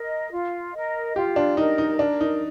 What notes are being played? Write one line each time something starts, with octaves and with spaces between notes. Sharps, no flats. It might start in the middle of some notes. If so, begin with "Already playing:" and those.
Already playing: A#4 D#5
F4
A#4 D#5
F4 G4
D4
D#4 A#4 D#5
D#4
D4 A#4
D#4